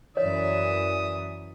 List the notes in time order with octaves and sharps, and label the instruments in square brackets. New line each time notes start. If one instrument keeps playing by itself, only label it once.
[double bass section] F#2 E3 [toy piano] C#5 [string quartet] D5 E5 [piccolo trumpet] D#6